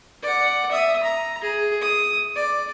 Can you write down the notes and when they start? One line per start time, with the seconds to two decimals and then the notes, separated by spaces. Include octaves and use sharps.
0.22 D5 F#5
0.71 E5 D#6
1.03 A#5
1.42 G#4
1.81 D#6
2.36 D5